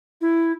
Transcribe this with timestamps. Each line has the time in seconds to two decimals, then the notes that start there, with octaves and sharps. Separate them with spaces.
0.21 E4